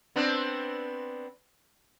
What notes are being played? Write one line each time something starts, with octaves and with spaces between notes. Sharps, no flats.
B3 C4 D4